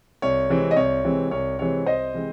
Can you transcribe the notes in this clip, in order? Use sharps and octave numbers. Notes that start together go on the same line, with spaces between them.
C2 C#5
C3 E3 G#3 C4
D#5
C2 C#5
C3 E3 G#3 C4
C2 C#5
C3 E3 G#3 C4 C#5
C2 C5 D#5
C3 E3 G#3 C4